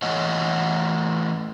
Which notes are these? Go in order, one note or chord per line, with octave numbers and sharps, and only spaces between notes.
A2 E3 A3 C#5 D#5 F#5